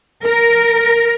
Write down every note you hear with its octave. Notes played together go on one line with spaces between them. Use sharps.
A#4